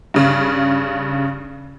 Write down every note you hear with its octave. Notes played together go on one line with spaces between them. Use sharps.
G2 C#3